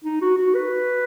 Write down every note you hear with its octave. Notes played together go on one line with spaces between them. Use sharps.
D#4
F#4
F#4
B4